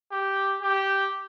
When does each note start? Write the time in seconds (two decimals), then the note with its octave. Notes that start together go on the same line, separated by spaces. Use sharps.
0.12 G4
0.62 G4